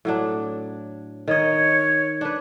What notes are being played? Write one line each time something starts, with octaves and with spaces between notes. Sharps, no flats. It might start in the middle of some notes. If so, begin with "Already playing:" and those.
A2 F#3 D4
D#3 C#5 D#5
D4 B4